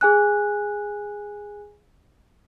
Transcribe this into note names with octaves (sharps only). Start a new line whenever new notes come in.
G#4 G#5 F#6